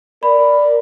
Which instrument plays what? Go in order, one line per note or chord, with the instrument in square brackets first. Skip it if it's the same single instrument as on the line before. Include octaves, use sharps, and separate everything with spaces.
[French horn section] A#4 D5 [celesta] B5